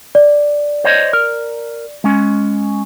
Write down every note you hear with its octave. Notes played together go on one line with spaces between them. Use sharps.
D5
C5 C#5 D#5
A#4
G#3 C#4